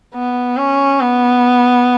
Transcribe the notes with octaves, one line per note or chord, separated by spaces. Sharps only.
B3
C#4
B3